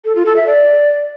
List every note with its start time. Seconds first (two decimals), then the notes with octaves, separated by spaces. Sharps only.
0.05 A4
0.15 F4
0.26 A4
0.36 E5
0.47 D5